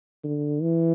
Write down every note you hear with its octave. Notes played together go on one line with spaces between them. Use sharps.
D3
E3